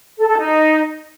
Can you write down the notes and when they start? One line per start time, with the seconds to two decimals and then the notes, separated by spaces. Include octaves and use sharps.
0.18 A4
0.28 A4
0.38 D#4